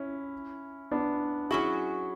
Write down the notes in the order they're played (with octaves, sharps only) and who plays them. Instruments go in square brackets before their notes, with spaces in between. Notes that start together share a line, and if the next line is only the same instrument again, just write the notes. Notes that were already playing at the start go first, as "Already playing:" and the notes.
Already playing: [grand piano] C#4 E4
B3 D4
[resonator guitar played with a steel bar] F#3 C#4 F#4 [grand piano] E4 G#4